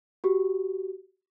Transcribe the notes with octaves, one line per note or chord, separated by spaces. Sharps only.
F#4 G4